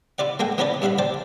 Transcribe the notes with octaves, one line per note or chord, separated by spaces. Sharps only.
E4 F4 D5 F#5
G#3 A#3 A4 F#5 G5
E3 B3 C#4 A#4 B4 D5
G2 E4 F5 F#5 B5
C5 D5 G5 A5